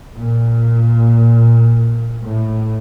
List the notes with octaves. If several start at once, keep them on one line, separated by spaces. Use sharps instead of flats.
A#2
A2